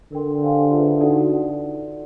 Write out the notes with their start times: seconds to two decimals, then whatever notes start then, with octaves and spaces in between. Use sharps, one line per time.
0.12 D3 A#4 D5 G5 C6
0.42 G4 C5 F5 G#5 C6
0.71 F4 G#4 B4 E5
1.01 D#4 F#4 A4 D5 F#5